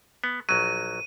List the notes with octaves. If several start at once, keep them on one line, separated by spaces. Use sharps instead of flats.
B3
A#1 F#3 D#7